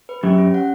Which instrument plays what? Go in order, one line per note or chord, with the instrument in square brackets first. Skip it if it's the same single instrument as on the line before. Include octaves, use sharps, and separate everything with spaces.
[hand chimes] B4
[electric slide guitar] F#2 [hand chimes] G4
[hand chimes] C#4
F#5